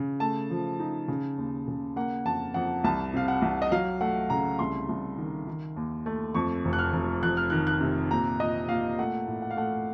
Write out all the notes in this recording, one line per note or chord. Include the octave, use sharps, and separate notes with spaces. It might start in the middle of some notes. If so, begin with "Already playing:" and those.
Already playing: C#3
A3 A5
F3
D#4
C#3
D#2
C#3
A#3 F#5
F2 A5
F2 F#5
C2 A5
C3 F5
F#5
C2
D#5
F#3 F5
A3 F#5
C#3 A#5
C2 C6
C2
D#3
D#3
D#2
A3
F2 C#6
F1
F#6
F6
F1
F2 F#6
F6
D#3 F#6
F#6
C3
A#2 A#5
A#2 D#5
A#2 F5
A3 F#5
A2
F#5
F5
A3 F#5